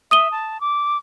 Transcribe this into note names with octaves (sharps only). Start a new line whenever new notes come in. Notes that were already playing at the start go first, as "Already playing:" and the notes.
E5 D#6 D#7 G7
A5
D6